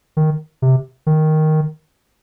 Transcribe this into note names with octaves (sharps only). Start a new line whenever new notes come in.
D#3
C3
D#3